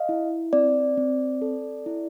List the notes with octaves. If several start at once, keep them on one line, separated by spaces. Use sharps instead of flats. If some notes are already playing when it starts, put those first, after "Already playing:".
Already playing: D#5 F5
E4
C4 D5
C4
A4
E4